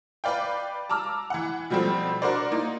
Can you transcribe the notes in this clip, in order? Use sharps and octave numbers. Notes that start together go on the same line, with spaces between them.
B4 D5 F5 G5
A5 A#5 D6 E6 F6
E3 F#5
B2 F3 G3 A3 C4
D4 F#4 A#4 C5 D5
A#3 D#4